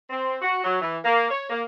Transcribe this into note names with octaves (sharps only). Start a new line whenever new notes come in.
C4
F#4
F#3
E3
A#3
C#5
A#3